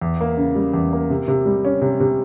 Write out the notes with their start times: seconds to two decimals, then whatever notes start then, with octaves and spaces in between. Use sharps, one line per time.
0.02 E2
0.21 A#3
0.37 C#3
0.55 G3
0.73 E2
0.93 A#3
1.10 C3
1.28 C3
1.46 G3
1.65 C#4
1.82 C3
2.00 C3